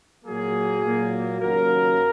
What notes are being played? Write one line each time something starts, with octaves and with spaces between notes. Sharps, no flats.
A#2 F#3 A#3 G#4
A#2 F#3 A#3
D#2 C#3 F#3 A#3 A#4